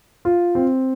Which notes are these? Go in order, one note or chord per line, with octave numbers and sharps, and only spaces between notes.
F4
C4